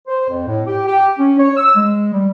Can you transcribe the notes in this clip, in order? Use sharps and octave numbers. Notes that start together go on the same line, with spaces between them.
C5
F2
A2
G4
G4
C#4
C#5
E6
G#3
G3